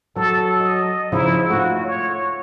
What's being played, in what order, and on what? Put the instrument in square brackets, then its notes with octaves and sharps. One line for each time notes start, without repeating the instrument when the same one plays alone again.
[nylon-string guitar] F#3 [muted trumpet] A4
[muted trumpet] D#5
[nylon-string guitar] C#3 F3 D#4 [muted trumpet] E4
[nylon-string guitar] A3 F4 [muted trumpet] F#4
[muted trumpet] C#5